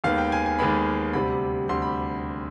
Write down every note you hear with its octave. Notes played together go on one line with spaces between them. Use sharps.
D#2 D#3 G#3 B3 F5
G5
G#5
G#5
D#2 D#3 G#3 B3 B5
D2 C3 G3 B5
D2 C3 G3 C6
B5